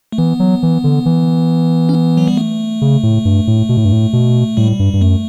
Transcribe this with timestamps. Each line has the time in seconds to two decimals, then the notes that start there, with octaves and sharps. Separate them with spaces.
0.12 A3
0.18 E3 B3
0.40 F#3
0.63 E3
0.84 D3
1.06 E3
1.89 C#4
1.94 B3
2.17 F#3
2.28 G3
2.37 A3
2.82 C#3
3.03 A2
3.25 G2
3.47 A2
3.69 B2
3.77 A2
3.85 G2
3.92 A2
4.13 B2
4.57 A2 G3
4.79 G2
4.93 G2
5.01 F#2 A3